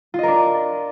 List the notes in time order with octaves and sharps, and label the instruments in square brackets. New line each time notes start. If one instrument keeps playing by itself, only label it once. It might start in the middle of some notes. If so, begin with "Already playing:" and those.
[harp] F4
D#5
A#4
D4